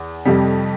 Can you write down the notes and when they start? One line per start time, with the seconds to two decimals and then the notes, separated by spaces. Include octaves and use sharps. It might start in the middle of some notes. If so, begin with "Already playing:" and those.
Already playing: E2
0.25 F2 C3 G3